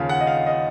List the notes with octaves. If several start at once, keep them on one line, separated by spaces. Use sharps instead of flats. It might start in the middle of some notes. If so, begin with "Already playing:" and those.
Already playing: D#2 C#3 F3 F5
F#5
D#5
F5
D#5